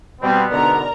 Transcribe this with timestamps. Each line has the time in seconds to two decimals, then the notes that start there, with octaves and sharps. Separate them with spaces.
0.22 B2 G3 B3 C4
0.51 G#2 B2 D3 A#4 D5 A#5